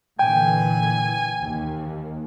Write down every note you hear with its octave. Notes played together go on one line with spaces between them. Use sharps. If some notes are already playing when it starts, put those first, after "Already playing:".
A#2 D3 E3 G5 G#5
D#2